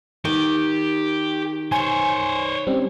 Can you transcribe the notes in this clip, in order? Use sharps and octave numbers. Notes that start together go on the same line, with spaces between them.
D#3 G4
C5 C#5 G#5
G3 C4 C#4